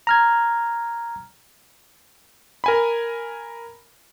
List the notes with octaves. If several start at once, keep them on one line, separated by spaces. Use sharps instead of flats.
A#5 F6 G#6
A#4 G#5 B5